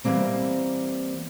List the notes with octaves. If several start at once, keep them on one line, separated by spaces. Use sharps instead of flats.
E3 F3 G3 A#3 C4